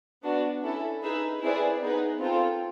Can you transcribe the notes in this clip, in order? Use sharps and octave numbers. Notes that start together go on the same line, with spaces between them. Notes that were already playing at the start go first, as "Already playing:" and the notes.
B3 D4 F#4
C#4 E4 A4
D#4 G#4 B4 E5
C4 E4 G#4 B4 D5
B3 D#4 G#4 B4
C4 F4 A4